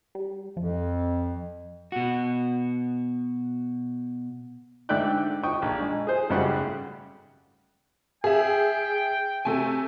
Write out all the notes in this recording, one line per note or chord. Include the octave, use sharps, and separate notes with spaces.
G3
F2 F3
B2 F#4
G#2 D3 D5 E5 G5 F#6
G5 C#6 D#6
A#1
G#3
G#4 C5
G#1 F#2 C#3 G3 A3 F#5
G#4 E5 G5
C3 A3 G#5